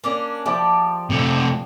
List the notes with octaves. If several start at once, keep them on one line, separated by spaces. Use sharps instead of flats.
A#3 C#4 D4
F3 G4 D5 A5 B5
C3 A3